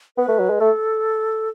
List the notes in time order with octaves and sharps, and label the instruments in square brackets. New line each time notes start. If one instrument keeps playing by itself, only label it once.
[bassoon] B3 [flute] B4
[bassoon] A3
F#3
G#3
[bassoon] A3 [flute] A4